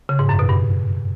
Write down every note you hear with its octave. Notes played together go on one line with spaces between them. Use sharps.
C#3
G#2
F#2
B2
G2